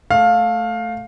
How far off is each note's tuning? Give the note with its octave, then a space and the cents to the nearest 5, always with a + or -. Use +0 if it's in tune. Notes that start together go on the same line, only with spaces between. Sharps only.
A3 +0 F5 +15